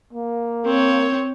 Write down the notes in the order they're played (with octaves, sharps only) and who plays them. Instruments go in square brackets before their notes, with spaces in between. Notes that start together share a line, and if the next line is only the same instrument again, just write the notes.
[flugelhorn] A#3
[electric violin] C4 C#5 [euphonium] A#4